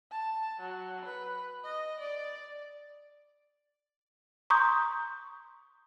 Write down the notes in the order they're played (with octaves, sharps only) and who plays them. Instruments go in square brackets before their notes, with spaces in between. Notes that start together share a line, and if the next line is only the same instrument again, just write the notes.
[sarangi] A5
F#3
B4
D#5
D5
[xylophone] A#5 C6 C#6 D#6 G6